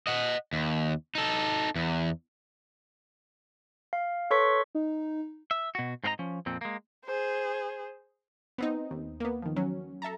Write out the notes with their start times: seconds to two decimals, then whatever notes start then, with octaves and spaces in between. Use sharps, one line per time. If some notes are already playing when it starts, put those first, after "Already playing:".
0.07 D#5 F#5
0.53 D#2
1.15 D#4 A4
1.76 E2
3.93 F5
4.31 A4 B4 C#5 C6 C#6 B6
4.75 D#4
5.51 E5
5.75 B2 F#4
6.04 G#2 C4 F4 A#4 D#5 A#5
6.19 F3 C#4
6.46 F2 A#2 C4
6.61 G#3 A#3
7.05 G#4 C5
8.58 B3 C4 D#4
8.91 D#2
9.20 A#3 B3
9.42 D#3 F3
9.56 F#3 C#4
10.02 A4 E5 A5 A#5